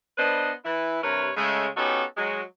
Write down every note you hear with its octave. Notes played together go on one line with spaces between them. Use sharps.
B3 D4 B4 C5 D#5
E3 E4 B4
G2 C3 A#4 B4 C#5
C#3 G#3 A3
B3 C#4 D#4 F#4 G4 A4
F#3 G#3 F#4